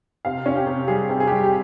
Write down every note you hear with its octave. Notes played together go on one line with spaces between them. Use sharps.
C3 F5
C#4
G4
C3
G3 G#4
C3
G#4
G4
G3
G4